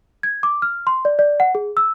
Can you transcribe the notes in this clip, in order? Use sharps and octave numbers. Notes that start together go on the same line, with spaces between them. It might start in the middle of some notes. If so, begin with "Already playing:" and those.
G#6
D6
F6
C6
D5
D5
F#5
G#4
E6